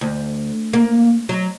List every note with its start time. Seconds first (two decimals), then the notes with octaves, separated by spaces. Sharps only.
0.01 D2
0.73 A#3
1.29 F#3